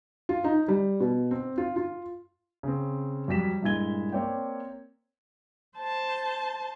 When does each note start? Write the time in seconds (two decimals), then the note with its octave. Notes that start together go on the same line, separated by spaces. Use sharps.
0.29 F4
0.44 D#4
0.68 G3
1.00 B2
1.31 C4
1.58 F4
1.76 F4
2.63 C#3 C4
3.28 F2 F#3 G3 B6 E7
3.62 G2 A#2 G#3 E4 G#6 G7
4.12 A#3 C4 C#5 D5 G5
5.78 C5 A5